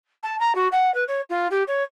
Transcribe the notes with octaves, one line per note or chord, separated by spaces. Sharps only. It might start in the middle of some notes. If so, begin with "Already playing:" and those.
A5
A#5
F#4
F#5
B4
C#5
F4
G4
C#5